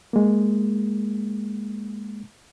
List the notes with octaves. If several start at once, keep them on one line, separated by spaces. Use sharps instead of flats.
G#3 A#3